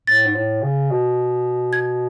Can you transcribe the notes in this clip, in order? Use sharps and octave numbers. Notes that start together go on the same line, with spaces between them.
A2 A6
G#2
A2
C#3
B2
G#6